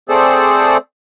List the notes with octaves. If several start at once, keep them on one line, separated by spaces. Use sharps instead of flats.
A3 C4 G#4 A4 C5 D5